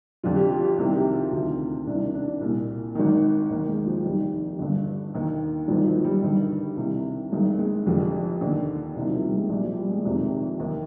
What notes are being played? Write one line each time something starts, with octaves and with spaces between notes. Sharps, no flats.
F1 F2 D3 F4
G4
F4
G4
C2 C3 D#3
G4
F4
D2 C3 D#3 F4
C2 C3 D#3 D4
D4
C2 A#2
G#1 G#2 D#3
D#2 D#3 A#3
G#3
F3
F1 D#2 D#3 G3
G1 G2 D3
D#2 D#3
G#1 G2 D#3 F3
F3
G3
G1 G2 D#3
C2 C3 D#3
G#1 G2 D#3 G#3
G#3
F1 F2 D3
D#2 D3
C2 C3 D#3 G3
F3
G3
G#3
A#1 A#2 G3
F3
G3
G#3
F1 F2 C3 D#3
D#2 D#3